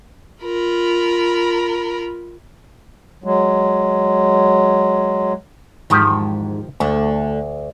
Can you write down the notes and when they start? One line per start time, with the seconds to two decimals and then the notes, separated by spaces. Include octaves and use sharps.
0.43 F4 A#4 B5
3.24 F#3 G#3
5.90 E2 G#2 D#3 F3 G4
6.80 D2 D3 A3